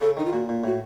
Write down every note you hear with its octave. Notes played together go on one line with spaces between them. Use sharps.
C#3 A4
D#3 D#4
F4
A#2 F#4
A#2
A2 F#4